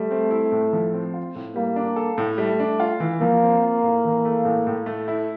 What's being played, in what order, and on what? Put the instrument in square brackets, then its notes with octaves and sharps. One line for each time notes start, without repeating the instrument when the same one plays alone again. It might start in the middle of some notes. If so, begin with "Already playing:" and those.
Already playing: [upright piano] G3 [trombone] A3
[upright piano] C4
E4
A2
F3
C4
F4
A2
[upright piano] G3 [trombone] A#3
[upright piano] D4
A4
A2
[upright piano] G3 [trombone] A3
[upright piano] D4
F4
E3
[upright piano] F3 [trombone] A#3
[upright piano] C4
F4
A2
E3
A3
A2
A2
A3
E4